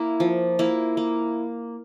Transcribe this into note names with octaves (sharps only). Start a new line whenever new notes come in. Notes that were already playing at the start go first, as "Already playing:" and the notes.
Already playing: A#3 E4
F3
A#3 E4
A#3